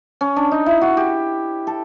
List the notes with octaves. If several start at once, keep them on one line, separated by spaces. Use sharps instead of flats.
C#4
D4
D#4
E4
F#4
G4
A4